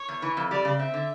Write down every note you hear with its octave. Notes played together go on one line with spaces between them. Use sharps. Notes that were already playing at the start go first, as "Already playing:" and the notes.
Already playing: C#5
E2
E3
F2
G3 D5
C#3
C4 E5
D3